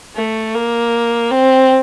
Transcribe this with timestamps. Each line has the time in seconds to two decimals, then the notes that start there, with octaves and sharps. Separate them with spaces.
0.15 A3
0.54 A#3
1.31 C4